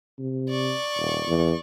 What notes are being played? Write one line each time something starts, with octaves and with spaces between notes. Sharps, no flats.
C3
D5 C#6
D#1
E2